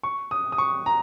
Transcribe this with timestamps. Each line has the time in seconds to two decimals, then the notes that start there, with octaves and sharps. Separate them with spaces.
0.03 C#6
0.31 D#6
0.52 D#6
0.58 C#6
0.86 A#5